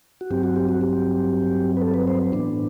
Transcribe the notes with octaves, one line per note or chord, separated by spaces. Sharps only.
F#4
G2 F#3 C4 G4
F#4
G4
F#4
G4
B4
A4
B4
C5
A2 E3 B3 D4